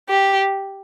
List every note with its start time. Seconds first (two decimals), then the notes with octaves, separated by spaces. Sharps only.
0.09 G4